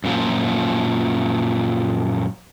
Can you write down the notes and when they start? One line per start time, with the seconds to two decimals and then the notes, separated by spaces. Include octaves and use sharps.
0.04 F#2 A#2 F3